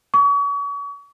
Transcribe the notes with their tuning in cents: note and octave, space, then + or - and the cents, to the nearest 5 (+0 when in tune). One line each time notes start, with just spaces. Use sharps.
C#6 +40